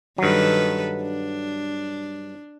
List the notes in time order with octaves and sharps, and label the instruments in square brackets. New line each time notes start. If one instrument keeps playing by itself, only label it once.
[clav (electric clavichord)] G2 F#3 [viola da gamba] D#3 A4 B4
[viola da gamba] D4